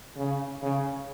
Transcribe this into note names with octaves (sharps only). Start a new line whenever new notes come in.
C#3
C#3